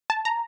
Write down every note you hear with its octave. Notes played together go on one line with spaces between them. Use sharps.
A5
A#5